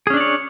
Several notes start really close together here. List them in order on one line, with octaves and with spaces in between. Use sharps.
G#4 C#4 D4 D5 C#5